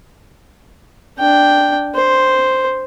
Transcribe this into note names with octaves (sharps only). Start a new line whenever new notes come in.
D4 G5
C5